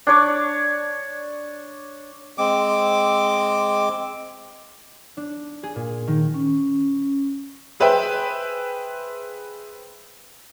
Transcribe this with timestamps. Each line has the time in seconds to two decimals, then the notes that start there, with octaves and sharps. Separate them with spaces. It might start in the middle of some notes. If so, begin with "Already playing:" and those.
0.07 D4 C#5 D5
2.38 G#3 C4 D6
5.17 D4
5.63 G#4
5.76 A#2
6.08 D#3
6.34 C#4
7.80 G#4 B4 C5 E5 G5